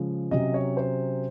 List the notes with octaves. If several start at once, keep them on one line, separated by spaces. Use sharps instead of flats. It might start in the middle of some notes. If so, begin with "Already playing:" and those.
Already playing: C#3 F3 G#3
C3 F#3 C#4 D#5
C#5
C5